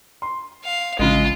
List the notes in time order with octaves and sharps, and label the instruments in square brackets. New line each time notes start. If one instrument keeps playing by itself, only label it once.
[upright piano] C6
[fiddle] F5
[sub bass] A1 [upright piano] C#3 G#3 [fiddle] F4